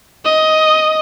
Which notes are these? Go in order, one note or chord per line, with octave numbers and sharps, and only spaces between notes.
D#5